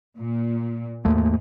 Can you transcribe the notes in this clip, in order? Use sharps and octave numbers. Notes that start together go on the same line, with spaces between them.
A#2
D#2 G#2 A3 A#3